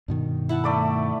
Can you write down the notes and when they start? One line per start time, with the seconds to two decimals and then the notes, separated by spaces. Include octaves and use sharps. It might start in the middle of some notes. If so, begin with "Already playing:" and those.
0.08 G2 B2 D#3
0.49 E4 F#5 A5
0.64 A3 D5 B5